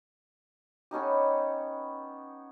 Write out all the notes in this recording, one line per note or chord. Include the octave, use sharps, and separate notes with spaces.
B3 C#4 D#4 G4